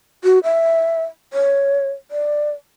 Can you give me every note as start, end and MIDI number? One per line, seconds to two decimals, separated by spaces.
0.24 0.39 66
0.44 1.03 76
1.33 1.89 73
2.11 2.51 74